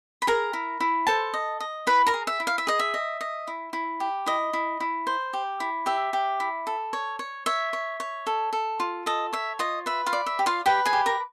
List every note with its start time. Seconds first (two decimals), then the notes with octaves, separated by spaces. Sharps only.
0.22 B5
0.27 G#4 A#4 A#5
0.53 E4
0.80 E4
1.07 A4 C5 A5
1.34 D#5
1.60 D#5
1.87 E4 B4 B5
2.06 A#4 A#5
2.14 G#4
2.27 E5
2.40 E4
2.47 F5
2.58 E5
2.67 G#4 D#5
2.79 E5
2.94 D#5
3.21 D#5
3.47 E4
3.73 E4
4.00 G4
4.26 E4 D#5
4.53 E4
4.80 E4
5.07 C5
5.33 G4
5.60 E4
5.86 G4 E5
6.13 G4
6.40 E4
6.67 A4
6.93 C#5
7.19 C#5
7.46 C#5 E5
7.73 C#5
8.00 C#5
8.27 A4
8.53 A4
8.80 F4
9.06 A4 D#5
9.33 C#5 E5
9.59 F4 D#5
9.86 B4 E5
10.06 F4 F5
10.13 D5
10.26 E5
10.39 G4
10.46 F4 F5
10.66 G4 B4 G5
10.85 G#4 G#5
10.93 G4
11.06 A#4 A#5